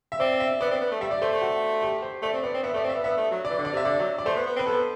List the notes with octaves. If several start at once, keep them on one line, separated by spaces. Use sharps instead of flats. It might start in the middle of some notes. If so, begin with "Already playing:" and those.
E5
C4 D5
E5
B3 D5
C4
B3
A3
G3 E5
D5
A3 C5
A3
F#4
G4
C5
A3 D5
C4
B3 D5
C4
B3 E5
A3
D5
C4
B3 E5
B3 E5
A3
F#3
D5
E3
D3
D5
C3
E5
D3 D5
F#3
D5
A3 C5
B3
B3
C4
B4
B3 A4